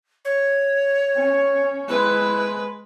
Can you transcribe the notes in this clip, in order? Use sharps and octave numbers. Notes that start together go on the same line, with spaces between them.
C#5
C#4
G#3 E4 B4